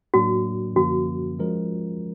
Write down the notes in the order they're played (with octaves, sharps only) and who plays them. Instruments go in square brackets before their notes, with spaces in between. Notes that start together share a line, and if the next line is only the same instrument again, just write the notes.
[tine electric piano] A2 F#3 A#3 D4 [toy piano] F#4
[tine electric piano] F#2 D3 F3 A#3 C#4 [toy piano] F#4
[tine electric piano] F3 G#3 C#4 F4 A#4